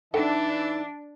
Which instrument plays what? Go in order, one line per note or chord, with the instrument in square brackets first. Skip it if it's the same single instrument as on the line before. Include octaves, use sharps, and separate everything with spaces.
[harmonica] E3 E5 A5 [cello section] D4 [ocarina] D#4 [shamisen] A4 F#5 G5